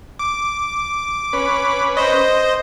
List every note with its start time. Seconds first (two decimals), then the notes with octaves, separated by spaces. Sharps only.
0.19 D6
1.33 C#4 B4
1.97 C5 D#5